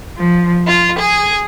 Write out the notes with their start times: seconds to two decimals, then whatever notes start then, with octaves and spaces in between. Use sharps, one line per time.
0.17 F3
0.68 F4
0.98 G#4